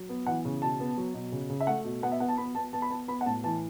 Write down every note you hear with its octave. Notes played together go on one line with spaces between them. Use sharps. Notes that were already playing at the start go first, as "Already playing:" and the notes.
Already playing: F#3
B3
E3 F#5
C#3
B2 A5
B3
F#3
B2
C#3
C#3
E5
A3 F#5
B2
B3 F#5
E5
B3 F#5
A5
B3 B5
B3 A5
B3 A5
B5
B3 A5
B3 B5
F#5
A2 A5
E3 A5